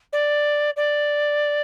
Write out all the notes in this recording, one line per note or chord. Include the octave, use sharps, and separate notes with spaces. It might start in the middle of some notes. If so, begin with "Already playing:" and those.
D5
D5